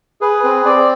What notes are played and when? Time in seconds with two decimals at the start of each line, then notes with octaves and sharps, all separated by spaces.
0.21 G#4 B4
0.44 C4 B4
0.65 C4 D5